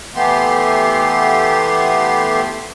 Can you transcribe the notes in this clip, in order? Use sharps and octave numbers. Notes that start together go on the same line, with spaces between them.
E3 A3 B3 G4 C6